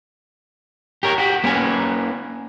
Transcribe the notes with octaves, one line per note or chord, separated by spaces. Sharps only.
G4 A#4 C#5
F#4 G4
A#3 C#4 B4 G#5